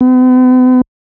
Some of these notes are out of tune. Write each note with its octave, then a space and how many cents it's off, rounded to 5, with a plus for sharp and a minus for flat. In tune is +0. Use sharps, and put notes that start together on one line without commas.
B3 +45